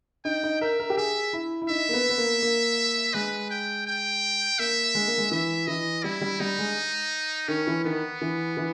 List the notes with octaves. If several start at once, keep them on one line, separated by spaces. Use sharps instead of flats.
D#4 G5
D#4
A#4 E5
A#4
G4
G#4 E5
E4
E4
D#4 E5
A#3
B3
B3
A#3
A#3
G#3 B4
G5
G5
A#3 E5
G#3
A#3
G#3
E3 E5
E3 D#5
G3 E4
G3
G3 D#4
G#3
D#3 C#4
E3
D#3 B3
E3
E3